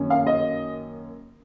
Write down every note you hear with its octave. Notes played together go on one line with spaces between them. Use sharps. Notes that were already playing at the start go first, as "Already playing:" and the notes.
Already playing: F#2 D#3 A#3 C#4
F5
D#5